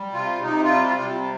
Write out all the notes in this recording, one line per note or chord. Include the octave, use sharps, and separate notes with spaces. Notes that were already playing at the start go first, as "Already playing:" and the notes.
Already playing: G3
C3 F4
C3 D#4
F4
G3
F4
C3